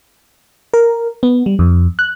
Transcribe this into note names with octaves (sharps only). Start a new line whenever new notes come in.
A#4
B3
G3
F2
F#6